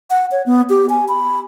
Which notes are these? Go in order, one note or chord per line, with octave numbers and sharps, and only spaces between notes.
F#5
C#5
B3
G4
G#5
B5